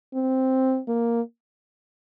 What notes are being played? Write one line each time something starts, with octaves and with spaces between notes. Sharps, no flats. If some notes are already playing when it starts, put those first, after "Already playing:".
C4
A#3